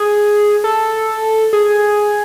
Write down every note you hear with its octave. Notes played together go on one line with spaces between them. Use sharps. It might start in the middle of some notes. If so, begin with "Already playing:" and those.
Already playing: G#4
A4
G#4